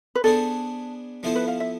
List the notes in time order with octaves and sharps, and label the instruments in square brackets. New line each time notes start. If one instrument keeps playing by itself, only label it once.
[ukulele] B4
[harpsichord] B3 D4 G#4 C5 [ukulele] A4
[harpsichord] F3 B3 E4 A4 C5
[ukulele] B4
F5
E5